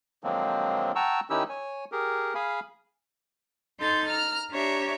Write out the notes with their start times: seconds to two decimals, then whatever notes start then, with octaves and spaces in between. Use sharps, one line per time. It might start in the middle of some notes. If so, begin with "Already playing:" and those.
0.24 D3 F3 F#3 G#3 A#3 C4
0.95 F#5 G5 A5 A#5 C#6 E6
1.30 D#3 C#4 D#4 E4 G4 E6
1.49 C#5 G#5
1.92 G4 G#4 A#4
2.35 G#4 F5 G#5 B5
3.79 D#4 A4 C6 G6 A6
4.08 A#5 F6
4.51 D4 G4 C#5 E5 A#5